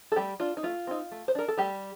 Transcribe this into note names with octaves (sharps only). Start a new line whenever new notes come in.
A4
G3 A3 G4
D4 F4
D#4
A3 F4
C4 D#4
A3
C5
D4 A#4
A4
G3 A3 G4